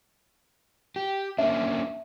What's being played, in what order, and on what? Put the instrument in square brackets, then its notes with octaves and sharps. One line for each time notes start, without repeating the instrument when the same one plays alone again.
[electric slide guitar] G4
[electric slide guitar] A#3 C#4 D4 [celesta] E5